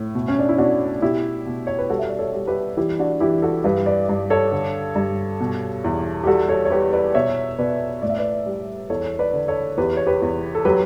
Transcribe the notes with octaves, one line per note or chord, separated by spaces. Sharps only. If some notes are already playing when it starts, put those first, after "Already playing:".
Already playing: A2
B2
C#4
D4
E4
B2 D4 F#4
B2 E4 G4
B2
C#5
B4
G3 F#4 A4
E5
D5
A4 C#5
G3
G4 B4
E3 E4 G4
D4 F#4
E3 E4 G4
F#4 A4
G2 G4 B4
B4 D5
G2
A4 C#5
D3
G2
B2
E2
G4
G3 F#4 A4
A4 C#5
C#5
G3 G4 B4
B4 D5
B2 C#5 E5
B2 B4 D5
A2 D5
E5
B4 D5
G3
E2 A4 C#5
B4 D5
D3
A4 C#5
E2 G4 B4
C#5
G4 B4
E2
A4
F#3 G4 B4